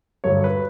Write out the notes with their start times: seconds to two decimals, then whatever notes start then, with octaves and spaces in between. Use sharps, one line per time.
0.24 G2 D3 F#3 C#5
0.44 B4